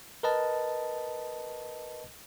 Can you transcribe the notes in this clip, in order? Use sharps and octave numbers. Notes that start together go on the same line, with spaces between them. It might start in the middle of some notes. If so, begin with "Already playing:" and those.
A#4 B4 D#5 A5